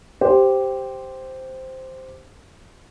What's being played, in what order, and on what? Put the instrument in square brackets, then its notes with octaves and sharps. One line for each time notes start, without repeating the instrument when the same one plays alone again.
[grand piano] G4 C5